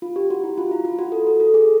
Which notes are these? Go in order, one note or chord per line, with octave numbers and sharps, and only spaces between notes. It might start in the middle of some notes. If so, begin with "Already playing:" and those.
F4
G4
F#4
E4
F4
E4
F4
F#4
A4
A4
A4
G#4